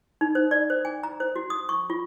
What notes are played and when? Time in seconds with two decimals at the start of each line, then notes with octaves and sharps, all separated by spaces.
0.21 D#4
0.35 C5
0.51 D5
0.70 C5
0.85 G#5
1.03 A#5
1.20 C5
1.36 F#4
1.50 D#6
1.69 C#6
1.90 F4